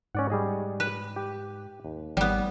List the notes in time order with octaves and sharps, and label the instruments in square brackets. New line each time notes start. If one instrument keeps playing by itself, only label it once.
[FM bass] G#2 [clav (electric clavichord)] C#4 D5 F#5
[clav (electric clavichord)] G3 G#4 D#5
[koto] B4
[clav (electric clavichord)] G4
D#2
[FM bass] G#1 [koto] G3 B3